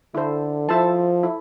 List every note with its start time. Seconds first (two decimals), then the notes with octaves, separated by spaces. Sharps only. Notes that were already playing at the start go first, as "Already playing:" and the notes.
0.15 D3 E4 A4 C5
0.69 F3 E4 A4 C5 E5 A5
1.23 E4 A4